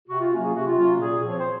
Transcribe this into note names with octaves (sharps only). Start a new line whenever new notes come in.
C3 F#4
F4
F#3 A#3 C#4 F#4
G#4
C3 F#4
F4
F#3 A#3 C#4 F4
F#4
A#2 G#4
F3 C4
C#5
C5